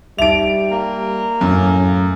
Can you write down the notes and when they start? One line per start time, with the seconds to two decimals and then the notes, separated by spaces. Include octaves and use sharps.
0.18 G3 D#4 E5 D7 F7
0.71 A#3
1.41 F#2 A2